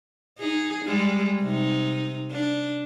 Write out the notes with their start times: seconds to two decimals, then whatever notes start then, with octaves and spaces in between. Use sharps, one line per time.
0.39 D#4 G#4
0.85 G3 G#3
1.41 C3 D#4
2.32 D4